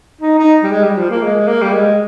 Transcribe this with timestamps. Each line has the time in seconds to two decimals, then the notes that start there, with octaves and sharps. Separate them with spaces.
0.21 D#4
0.38 D#4
0.63 G3
0.71 G#3
0.84 G3
0.97 F3
1.10 A#3
1.23 G#3
1.48 A#3
1.62 G3
1.73 G#3